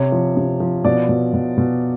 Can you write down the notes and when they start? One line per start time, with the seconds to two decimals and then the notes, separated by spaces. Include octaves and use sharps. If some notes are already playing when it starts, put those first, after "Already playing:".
Already playing: C3 C#5
0.12 F3
0.37 C3
0.60 F3
0.84 B2 D5
1.09 B2
1.33 B2
1.57 B2